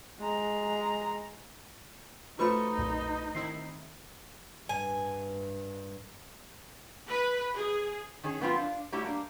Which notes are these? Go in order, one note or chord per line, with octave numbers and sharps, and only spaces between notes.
G#3 A#5
F3 A3 D#4 F#4 B4 B5 C#6
B1 F2 A#2
D#3 C4 E4 C7
G2 G#5
B4
G#4
D#3 C#4 G#4
F#3 B3 C4 D#4 F4
D4 F5
G3 A3 E4 F#4 G4 C#5
G3 A#3 D4